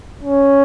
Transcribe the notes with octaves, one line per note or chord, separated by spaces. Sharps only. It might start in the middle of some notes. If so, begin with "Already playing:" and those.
C#4